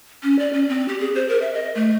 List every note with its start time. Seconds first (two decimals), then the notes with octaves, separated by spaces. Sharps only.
0.23 C#4
0.39 D5
0.53 C#4
0.69 C4
0.88 G4
1.00 G#4
1.15 C5
1.29 A#4
1.42 E5
1.54 D#5
1.75 A3